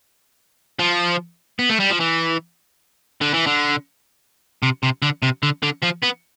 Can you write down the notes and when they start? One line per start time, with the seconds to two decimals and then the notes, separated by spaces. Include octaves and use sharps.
0.79 F3
1.59 B3
1.70 A3
1.80 G3
1.91 F3
2.00 E3
3.21 D3
3.34 E3
3.47 D3
4.63 C3
4.83 C3
5.02 D3
5.23 C3
5.43 D3
5.63 D3
5.83 F3
6.03 B3